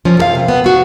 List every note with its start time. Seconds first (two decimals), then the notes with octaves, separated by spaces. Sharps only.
0.05 F3 C#4
0.17 F#2 A4 F5
0.35 C3
0.48 B3
0.64 F#3 F#4